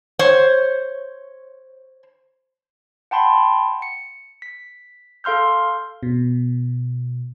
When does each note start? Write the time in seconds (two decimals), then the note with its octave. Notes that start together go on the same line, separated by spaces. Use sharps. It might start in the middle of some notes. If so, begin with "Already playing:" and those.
0.19 C5 C#5
3.11 F#5 G5 A5 B5 C6
3.82 C#7
4.42 B6
5.24 A4 F5 C6 F6 G6
6.03 B2